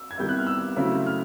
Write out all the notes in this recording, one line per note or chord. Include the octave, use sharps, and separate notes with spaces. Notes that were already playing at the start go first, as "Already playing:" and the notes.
Already playing: E6
G#6
C3 D#3 G3 B3 E4 G6
F#6
F6
E6
C#3 F#3 A3 C4 E4
F6